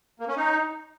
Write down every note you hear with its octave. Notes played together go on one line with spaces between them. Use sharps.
A#3
C#4
D#4